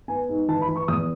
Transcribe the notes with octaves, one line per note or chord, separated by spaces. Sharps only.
B3 G#5
G#2
E3 A5
B5
E3
C#6
E2 D#6